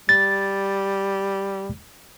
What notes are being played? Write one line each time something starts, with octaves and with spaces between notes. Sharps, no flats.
G3 A6